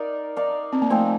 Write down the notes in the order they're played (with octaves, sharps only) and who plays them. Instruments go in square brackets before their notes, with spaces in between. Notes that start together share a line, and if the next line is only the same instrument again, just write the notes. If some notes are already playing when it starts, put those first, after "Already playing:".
Already playing: [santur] D#4 A#4 D5 F5
D#4 A#4 D5 F5
[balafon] C4
A#3
[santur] F3 C4 D#4 [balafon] A3